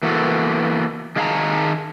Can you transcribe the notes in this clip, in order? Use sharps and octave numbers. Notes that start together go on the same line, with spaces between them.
E3 A#3 B3 F#4 A4
D#3 G#4 F5 F#5 A5 A#5